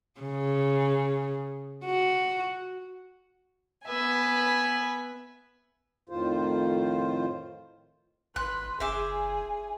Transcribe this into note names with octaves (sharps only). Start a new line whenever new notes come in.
C#3
F#4
B3 B4 E5 G#5
F2 A2 D#3 F4 C5
G#1 B4 C6 F#6
F#1 G#4 C5 E5 G#5 D6